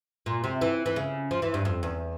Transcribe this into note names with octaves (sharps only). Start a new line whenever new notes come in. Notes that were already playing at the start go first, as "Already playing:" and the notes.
A#2
C3
E3
E3
C#3
F3
E3
G2
F2
E2